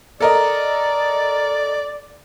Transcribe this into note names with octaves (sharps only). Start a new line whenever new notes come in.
A4 A#4 D5 D#5